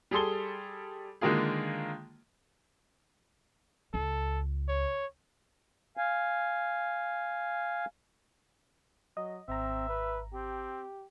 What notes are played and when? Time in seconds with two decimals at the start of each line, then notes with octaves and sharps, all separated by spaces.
0.11 G3 G#4 A4 C6 G7
1.21 D3 D#3 G#3 A#3 F4 G#4
3.94 C#2 A4
4.69 C#5
5.97 F5 G#5
9.17 F#3 D#5
9.48 G#1 C4 E5 A#5
9.88 B4
10.34 C4 G4